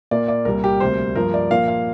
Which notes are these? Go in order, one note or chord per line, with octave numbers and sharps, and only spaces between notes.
A#2 A#3 D5
D5
C2 A#2 G3 A#4
G4
D2 C3 G3 A#3 C5
G2 F3 A#3 A#4
D5
A#2 F3 A#3 F5
F5